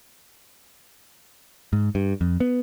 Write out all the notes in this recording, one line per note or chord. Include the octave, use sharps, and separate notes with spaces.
G#2
G2
F2
B3